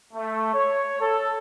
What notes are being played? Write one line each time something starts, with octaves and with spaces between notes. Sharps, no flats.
A3
C#5
A4